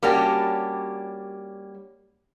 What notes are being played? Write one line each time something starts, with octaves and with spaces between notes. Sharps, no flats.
G3 A#3 C#4 D4 F#4 G4